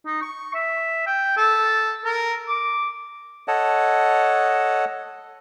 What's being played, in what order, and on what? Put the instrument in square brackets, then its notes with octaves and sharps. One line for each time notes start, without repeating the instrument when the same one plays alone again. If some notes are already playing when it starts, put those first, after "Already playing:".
[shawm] D#4
C#6
E5
G5
A4
A#4
D6
[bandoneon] A4 C#5 D#5 F#5 A5